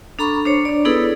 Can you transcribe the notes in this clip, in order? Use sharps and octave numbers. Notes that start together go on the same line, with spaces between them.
D4 A4 A#5 B5 C#6
D4 C5 C#5
D4 D5
B3 D#4 E4 G#4 A4 B4